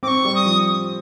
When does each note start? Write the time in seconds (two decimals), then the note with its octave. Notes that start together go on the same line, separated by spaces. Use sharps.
0.03 C4 D6
0.08 C#6
0.25 G3
0.35 D#6
0.45 F3